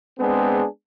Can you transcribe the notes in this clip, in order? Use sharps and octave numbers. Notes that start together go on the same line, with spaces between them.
G#3 B3 C4 D4 G#4